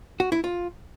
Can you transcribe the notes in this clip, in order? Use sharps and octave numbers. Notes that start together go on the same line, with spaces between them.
F#4
E4
F4